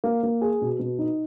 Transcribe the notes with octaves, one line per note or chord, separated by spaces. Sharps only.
A#3
A#3
G#4
B2
B2
D#4